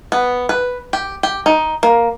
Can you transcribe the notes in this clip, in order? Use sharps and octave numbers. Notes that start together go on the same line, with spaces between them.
B3
B4
G4
G4
D#4
A#3